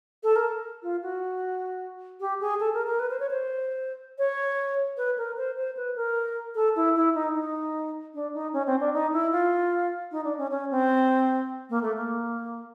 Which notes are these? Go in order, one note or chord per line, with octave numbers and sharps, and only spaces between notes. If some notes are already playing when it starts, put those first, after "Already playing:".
A4
A#4
F4
F#4
G4
G#4
A4
A#4
A#4
B4
C5
C#5
C5
C#5
B4
A#4
C5
C5
B4
A#4
A4
E4
E4
D#4
D#4
D4
D#4
C#4
C4
D4
D#4
E4
F4
D#4
D4
C#4
C#4
C4
A#3
A3
A#3